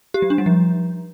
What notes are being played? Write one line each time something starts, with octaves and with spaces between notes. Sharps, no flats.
G4
F#3
D4
G3
F3